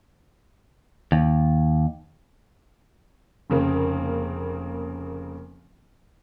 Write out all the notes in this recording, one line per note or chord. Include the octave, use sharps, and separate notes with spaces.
D#2
F1 C#3 A#3